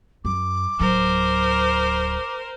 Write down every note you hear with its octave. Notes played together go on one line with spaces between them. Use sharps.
F#2 D6
D1 F#3 A#4 C5